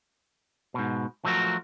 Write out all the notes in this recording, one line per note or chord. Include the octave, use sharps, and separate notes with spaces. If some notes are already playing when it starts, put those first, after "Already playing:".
G#2 B2
F3 F#3 A3 F#4 A#4